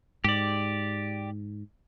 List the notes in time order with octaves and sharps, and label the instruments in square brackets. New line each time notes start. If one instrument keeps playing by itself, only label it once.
[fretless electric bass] G#2 [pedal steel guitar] G4 D5